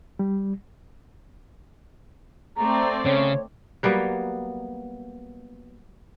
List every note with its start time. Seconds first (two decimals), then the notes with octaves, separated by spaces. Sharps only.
0.19 G3
2.57 A3 C4 D5 A#5
3.05 C#3 C#5
3.83 F#3 G3 A#3 B3